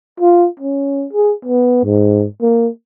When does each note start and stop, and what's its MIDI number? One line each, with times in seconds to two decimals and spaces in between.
0.20 0.48 65
0.60 1.06 61
1.13 1.33 68
1.45 1.81 59
1.84 2.26 44
2.42 2.68 58